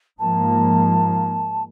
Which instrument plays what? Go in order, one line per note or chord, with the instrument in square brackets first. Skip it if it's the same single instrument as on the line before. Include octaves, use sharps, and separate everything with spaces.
[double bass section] G#2 F3 A#3 [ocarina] A5